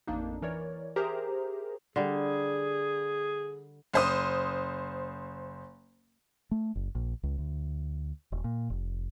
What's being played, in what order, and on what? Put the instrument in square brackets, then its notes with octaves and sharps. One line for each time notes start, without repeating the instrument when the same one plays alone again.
[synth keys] A1 F2 A#3 D4 D#4
E3 A#4 C#5 D5
G4 G#4 A#4 C5 E5 A#5
[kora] D3 G3 [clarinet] G#4
[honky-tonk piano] F#1 C5 D#6
[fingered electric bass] A3
F#1
A#1
C#2
D2
E1
A#2
F1